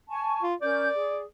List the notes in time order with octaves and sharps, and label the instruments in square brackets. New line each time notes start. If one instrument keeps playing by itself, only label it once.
[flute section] G#5 A5 C#6
[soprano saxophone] F4
[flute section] C#4 A#4 G6 [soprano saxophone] D5
[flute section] G#4